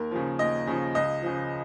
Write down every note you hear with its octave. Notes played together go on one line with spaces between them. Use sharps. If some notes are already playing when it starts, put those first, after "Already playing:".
Already playing: D#2 A#4
C#3 F3
D#2 D#5
C#3 F3
C#2 D#5
C#3 F3